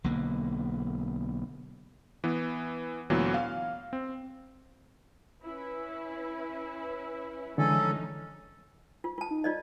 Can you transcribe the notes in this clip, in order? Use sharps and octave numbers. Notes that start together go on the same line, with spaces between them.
B1 D3 A#3
E3 B3
D2 A#2 E3 F#3 B3
F5
C4
C#4 E4 B4
D3 E3 F3 G#3 A3 C#4 D#4 A4
F4
F4 A5
D#4
F4 D5 D#5